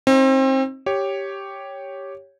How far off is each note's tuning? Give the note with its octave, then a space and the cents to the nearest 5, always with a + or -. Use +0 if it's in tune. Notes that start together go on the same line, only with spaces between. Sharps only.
C4 +30 D#4 +20
G4 +0 C#5 +0